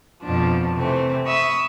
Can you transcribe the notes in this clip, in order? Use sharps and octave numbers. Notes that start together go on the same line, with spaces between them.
F2 B2 F3 D4
C3 E3 A3 C4
E5 B5 C#6 D#6 E6